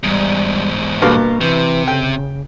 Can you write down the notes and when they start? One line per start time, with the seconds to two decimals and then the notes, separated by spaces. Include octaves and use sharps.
0.03 E2 G#2 G3
1.02 G2 B2 A#3 F5
1.41 C3 E3
1.88 C#3 G5